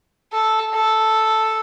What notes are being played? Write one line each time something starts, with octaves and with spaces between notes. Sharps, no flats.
A4
A4